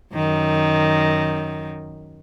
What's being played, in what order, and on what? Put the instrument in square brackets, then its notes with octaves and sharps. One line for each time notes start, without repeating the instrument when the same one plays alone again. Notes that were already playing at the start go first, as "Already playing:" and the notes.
[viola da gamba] F#2 D#3